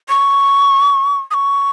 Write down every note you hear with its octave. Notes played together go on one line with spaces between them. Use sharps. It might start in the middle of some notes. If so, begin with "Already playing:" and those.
C#6
D#6
C#6